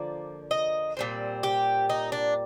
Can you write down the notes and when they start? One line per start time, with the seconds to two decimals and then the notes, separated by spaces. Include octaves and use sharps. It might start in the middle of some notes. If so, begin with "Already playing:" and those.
Already playing: D3 F3 A#3 D5
0.51 D#5
0.97 A#2 G3 C4
1.43 G4
1.89 D#4
2.12 D4